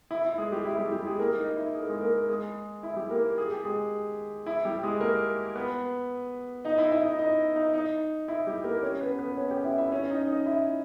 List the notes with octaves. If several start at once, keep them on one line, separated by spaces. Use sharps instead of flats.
E4
E4
G#3 G#4
G3 G4
E4
G3 G4
G3 G4
G#3 G#4
A#3 A#4
D#4
E4
G#4
A#4
G#3 G#4
A#3 A#4
G#3 G#4
E4
G3 G4
A#3 A#4
G#4
G4
G#3 G#4
E4
G3 G4
G#3 G#4
A#3 A#4
B3 B4
D#4 D#5
E4 E5
E4 E5
D#4 D#5
D#4 D#5
D#4
D#4
E4
G3 G4
A#3 A#4
C#4 C#5
B3 B4
B3 B4
C#4 C#5
G4 G5
E4 E5
G5
E4 E5
C#4 C#5
D#4 D#5
D#4 D#5
E4 E5